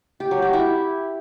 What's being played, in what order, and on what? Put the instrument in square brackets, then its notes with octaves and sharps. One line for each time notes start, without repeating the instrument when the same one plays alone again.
[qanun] G4
F#3
G4
E4